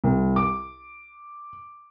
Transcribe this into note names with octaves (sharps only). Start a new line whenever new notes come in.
C2
D6